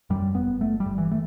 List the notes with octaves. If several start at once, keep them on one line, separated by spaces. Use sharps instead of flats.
F#2 G3
G1 B3
G1 A3
G3
G1
E3
A3